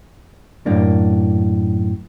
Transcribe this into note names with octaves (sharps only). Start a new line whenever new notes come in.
F#2 A2 A#3 D4